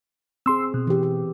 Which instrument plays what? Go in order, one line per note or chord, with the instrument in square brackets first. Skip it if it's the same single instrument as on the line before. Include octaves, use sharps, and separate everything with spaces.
[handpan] C4 G#4 [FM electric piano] C6 E6
[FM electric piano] B2
[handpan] E3 G4
G4